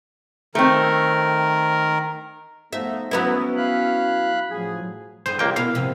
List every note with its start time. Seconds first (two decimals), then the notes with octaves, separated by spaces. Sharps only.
0.55 D#3 A3 C4 A#4
2.73 F3 A3 B3 D#4 E5
3.11 F#3 B3 C#4 E4
3.56 F5 B5 F#6
4.50 A2 F3 F#3 G#4
5.26 G2 D3 G#4 C5
5.39 C#2 G3 A#3 G5
5.56 B2 E4 A#4 F5
5.75 G#2 C3 F3